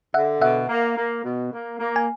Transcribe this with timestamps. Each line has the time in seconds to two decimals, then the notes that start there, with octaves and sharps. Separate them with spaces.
0.14 D3 E5 F#5
0.41 B2 E5 F#5
0.69 A#3
0.97 A#3
1.24 B2
1.52 A#3
1.79 A#3
1.96 G#5